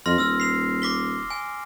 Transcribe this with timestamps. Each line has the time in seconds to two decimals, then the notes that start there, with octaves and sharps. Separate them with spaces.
0.06 F2 C6 F6 A#6
0.18 D#1 E6 F6
0.40 C7 F7
0.82 D6 B6 G7
1.30 G#5